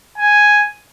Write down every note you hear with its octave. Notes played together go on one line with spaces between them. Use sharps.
G#5